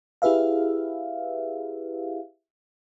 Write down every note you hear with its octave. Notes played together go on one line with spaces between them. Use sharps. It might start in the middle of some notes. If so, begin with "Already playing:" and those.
E4 G4 G#4 B4 E5 F5